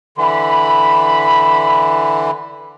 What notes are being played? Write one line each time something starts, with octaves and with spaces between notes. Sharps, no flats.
D3 E3 B5